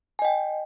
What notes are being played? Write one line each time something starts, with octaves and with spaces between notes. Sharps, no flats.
D#5 G5 G#5